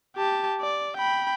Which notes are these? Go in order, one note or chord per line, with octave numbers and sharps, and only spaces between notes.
G4 A5
D5
G5 B5